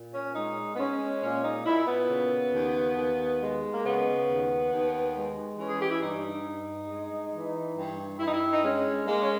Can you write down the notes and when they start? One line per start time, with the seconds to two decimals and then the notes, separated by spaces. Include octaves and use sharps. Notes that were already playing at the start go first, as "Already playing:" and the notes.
Already playing: A#2
0.13 C#4
0.34 G#3 D#4
0.74 B3
0.78 G#3 C#4
1.21 A#2 C#4
1.43 D#4
1.65 A#2 E4
1.86 B3
2.09 C#3
2.52 D#2
2.96 D#2
3.40 G#3
3.73 A#3
3.83 C#3 B3
4.26 D#2
4.71 D#2
5.14 G#3
5.58 E3 C#4
5.69 G#4
5.80 G4
5.91 E4
6.01 G2 D#4
6.45 G2
6.88 G#3
7.32 E3
7.76 G2
8.19 G2 E4
8.26 D#4
8.34 E4
8.53 D#4
8.63 G#3 C#4
9.06 G#3 A#3
9.21 C#4